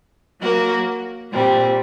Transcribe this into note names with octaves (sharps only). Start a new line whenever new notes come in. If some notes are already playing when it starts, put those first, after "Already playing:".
F#3 A#3 F#4 A#4
A#2 G3 C4